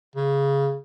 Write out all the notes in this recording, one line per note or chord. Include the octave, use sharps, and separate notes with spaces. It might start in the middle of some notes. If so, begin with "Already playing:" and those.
C#3